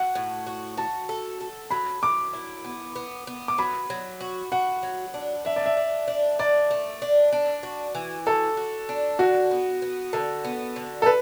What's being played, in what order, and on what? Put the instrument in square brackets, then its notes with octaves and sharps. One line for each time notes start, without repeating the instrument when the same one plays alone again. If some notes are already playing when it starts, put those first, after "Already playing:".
Already playing: [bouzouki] F#4 [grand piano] F#5
[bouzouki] A2
F#4
[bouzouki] F#4 [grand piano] A5
[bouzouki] A4
A4
[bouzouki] F#3 [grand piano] B5
[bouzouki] F#3 [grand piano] D6
[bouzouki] E4
B3
B3
B3
[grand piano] D6
[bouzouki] F#3 [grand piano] B5
[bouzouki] F#3
F#4
[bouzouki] F#4 [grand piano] F#5
[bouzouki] F#3
D4
[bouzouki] D4 [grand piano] E5
[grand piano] D5
E5
[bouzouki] D4
D4
[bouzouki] D4 [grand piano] D5
[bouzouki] A3
D4
D4
F#4
E3
[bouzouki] F#4 [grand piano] A4
[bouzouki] F#4
D4
[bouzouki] D3 [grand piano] F#4
[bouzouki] B3
B3
[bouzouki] D3 [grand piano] A4
[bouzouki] B3
D3
[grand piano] A4
B4